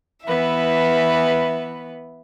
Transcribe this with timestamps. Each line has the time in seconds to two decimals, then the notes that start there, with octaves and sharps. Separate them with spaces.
0.25 E3 B3 B4 E5